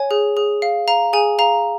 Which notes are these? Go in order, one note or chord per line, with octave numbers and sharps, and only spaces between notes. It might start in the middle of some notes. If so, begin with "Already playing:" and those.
Already playing: C#5 G#5
G#4
G#4
F5
F5 A#5
G#4 G#5
F5 A#5